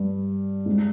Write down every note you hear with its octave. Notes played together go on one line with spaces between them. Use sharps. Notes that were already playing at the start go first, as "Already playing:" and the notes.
Already playing: G2
G#2